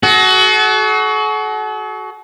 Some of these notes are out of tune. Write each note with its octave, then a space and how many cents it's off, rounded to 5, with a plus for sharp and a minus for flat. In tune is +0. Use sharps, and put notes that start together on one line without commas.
F#4 +20 A4 -45